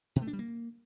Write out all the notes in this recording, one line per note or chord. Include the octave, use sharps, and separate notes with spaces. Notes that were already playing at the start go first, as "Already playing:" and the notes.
B2
A3
D4
G3
A#3